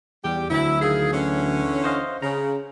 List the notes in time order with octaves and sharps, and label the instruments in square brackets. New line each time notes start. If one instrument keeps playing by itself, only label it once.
[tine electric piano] E2 [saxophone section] G3 G4
[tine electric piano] D2 F#3 [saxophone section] E4
[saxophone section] D#3 F4 G#4
D3 E3 C#4
[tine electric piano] C5 D#5 F5
[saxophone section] C#3 [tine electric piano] A#5